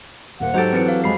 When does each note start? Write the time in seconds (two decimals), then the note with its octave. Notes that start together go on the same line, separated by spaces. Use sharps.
0.40 D#1 A#3 C5 F#5
0.54 G#2 F#3 G4 A4 C5 D7
0.73 E3 C4 B4 A6 C#7
0.88 F5
1.04 F2 G#3 C5 B5 C7